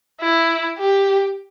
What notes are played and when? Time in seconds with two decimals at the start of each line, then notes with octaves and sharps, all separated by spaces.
0.21 E4
0.78 G4